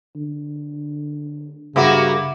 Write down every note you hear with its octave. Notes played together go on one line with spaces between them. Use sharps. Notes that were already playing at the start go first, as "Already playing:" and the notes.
D3
G2 C#3 A#3 B3 F#4 E5 D6